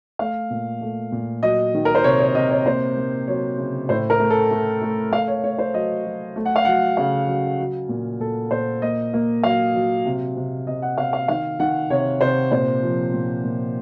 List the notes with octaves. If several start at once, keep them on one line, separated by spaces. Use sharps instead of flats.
A3 F5
A#2
A3
A#2
F#3 D#5
D#3
A#4
C5
C3 C#5
C#5
C3 D#5
C#5
A#3 C5
A#3
F#3 C#5
C#3
A2 C5
A#4
A3
A4
A3
A3
A3 F5
C#5
A3 C#5
C5
F#3 D#5
F#3
A3
F#5
F5
F#3 F#5
C#3 F5
F#3
F#3
A#2
A#2 A4
A#2 C5
A#3 D#5
A#3
F#3 F5
F#3
C3
C3
C3 D#5
F#5
C3 F5
F5
D#3 F5
D#3 F#5
C3 C#5
C3 C5
A#2 C5
F3
A#2
A#2